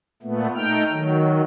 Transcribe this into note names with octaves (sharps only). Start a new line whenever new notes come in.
A#2 A3 B3
A3 D#4 G5 F6
D#3 F#3